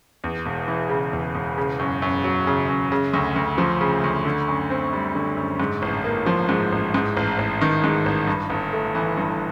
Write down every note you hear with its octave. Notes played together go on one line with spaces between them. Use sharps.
E2
E1
E3
C#3
E2
E1
C#3
F#2
F#2
F#3
C#3
F#2
C#3
D2
D2
F3
C#3
D2
D3
F#2
C4
G3
D3
F#2
G#2
A1
A#3
F3
G#2
A1
G#2
A1
A1
D#3
G#2
A1
G2
G1
A3
E3
G2